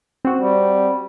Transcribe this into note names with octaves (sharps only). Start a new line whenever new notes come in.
C4 F#4
G3